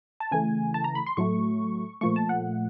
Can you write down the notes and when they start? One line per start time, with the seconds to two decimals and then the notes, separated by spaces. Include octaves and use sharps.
0.20 A5
0.31 C#3 E3 A3 G#5
0.74 A5
0.84 A#5
0.95 B5
1.06 C6
1.17 A2 F#3 A3 C#6
2.01 A#2 F3 A3 C#6
2.16 A5
2.29 F#5